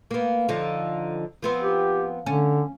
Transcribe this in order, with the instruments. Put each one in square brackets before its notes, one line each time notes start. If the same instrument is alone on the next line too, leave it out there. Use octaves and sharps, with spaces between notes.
[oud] A#3 B3
D3 F3 D#4
F3 B3 C4
[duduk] G4
[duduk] D3 [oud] C#4